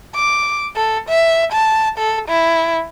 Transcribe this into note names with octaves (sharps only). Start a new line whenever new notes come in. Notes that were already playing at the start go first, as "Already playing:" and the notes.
D6
A4
E5
A5
A4
E4